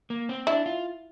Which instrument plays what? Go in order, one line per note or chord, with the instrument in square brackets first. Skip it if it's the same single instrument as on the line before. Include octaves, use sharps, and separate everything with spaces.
[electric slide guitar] A#3
C4
[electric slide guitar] D4 [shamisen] E4
[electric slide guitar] F4